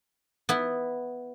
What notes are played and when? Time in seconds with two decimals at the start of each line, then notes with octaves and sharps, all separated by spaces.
0.49 B3 E4